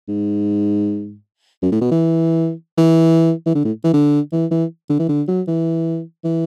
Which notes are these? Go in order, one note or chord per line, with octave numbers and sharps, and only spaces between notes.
G#2
F#2
A2
B2
E3
E3
E3
D3
A2
E3
D3
E3
E3
D3
E3
D3
F#3
E3
E3